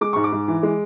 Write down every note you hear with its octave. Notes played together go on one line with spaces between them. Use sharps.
G#3 D6
G#2 C#6
D6
G#2
E3
G#3